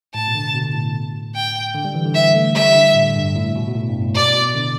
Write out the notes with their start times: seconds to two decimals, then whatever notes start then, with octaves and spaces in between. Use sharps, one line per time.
0.14 A2 A5
0.28 B2
0.35 D3
0.55 B2
0.75 A2
1.35 G5
1.75 D3
1.85 G3
1.95 E3
2.05 D3
2.14 E3 E5
2.35 A3
2.55 G3 E5
2.75 D3
2.95 A2
3.15 G2
3.35 A2
3.55 B2
3.68 B2
3.75 A2
3.89 G2
4.02 A2
4.15 B2 D5
4.35 B2
4.55 D3